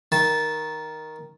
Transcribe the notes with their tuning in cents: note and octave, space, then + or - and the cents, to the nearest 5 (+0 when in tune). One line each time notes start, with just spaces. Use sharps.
D#3 +5 A5 -15